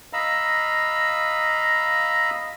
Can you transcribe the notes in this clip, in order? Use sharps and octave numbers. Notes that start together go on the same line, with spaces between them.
D#5 F5 A#5 B5 E6